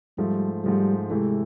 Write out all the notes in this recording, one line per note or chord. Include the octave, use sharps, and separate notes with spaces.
G#2 F3 G3 A3
G#2 F3 G3 A3
C3 E3 G#3 A3